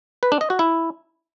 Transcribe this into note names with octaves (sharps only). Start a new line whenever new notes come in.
B4
D4
D#5
F#4
E4